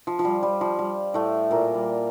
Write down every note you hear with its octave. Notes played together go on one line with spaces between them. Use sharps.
F3
F3
G3
G3
F3
G3
A2 A3
A#2 A#3
G3